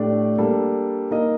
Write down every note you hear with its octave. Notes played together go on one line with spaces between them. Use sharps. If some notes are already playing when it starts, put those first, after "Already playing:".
Already playing: A2 A3 D4 G4 D5
G3 A#3 D4 A4
A#3 D#4 A#4 D#5